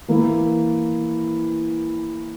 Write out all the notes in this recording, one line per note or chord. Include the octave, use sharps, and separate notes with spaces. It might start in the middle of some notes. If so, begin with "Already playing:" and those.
E3 A#3 E4